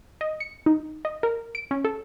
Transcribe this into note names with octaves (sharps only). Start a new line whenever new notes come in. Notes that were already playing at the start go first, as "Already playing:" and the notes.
D#5
C#7
D#4
D#5
A#4
D7
C#4
A4